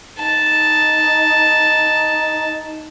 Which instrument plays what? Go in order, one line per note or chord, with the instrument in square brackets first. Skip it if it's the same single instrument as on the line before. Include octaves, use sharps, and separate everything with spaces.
[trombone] D#4 [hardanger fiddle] A5